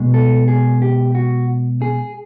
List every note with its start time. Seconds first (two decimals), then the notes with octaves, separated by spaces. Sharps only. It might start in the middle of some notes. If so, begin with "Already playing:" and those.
Already playing: B2 G#3
0.14 A4
0.48 G#4
0.82 G4
1.15 F#4
1.82 G#4